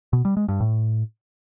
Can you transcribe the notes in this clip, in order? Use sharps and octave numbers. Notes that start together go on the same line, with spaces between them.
B2
G3
G#3
G2
A2